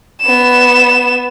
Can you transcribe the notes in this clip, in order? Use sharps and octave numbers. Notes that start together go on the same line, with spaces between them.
B3 E7